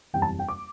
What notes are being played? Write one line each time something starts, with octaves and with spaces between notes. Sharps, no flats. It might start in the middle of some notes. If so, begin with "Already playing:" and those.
F#1 E2 C3 G3 G5
A5
G5
D6